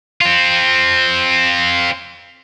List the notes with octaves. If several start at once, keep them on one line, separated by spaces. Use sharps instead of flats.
C4 F4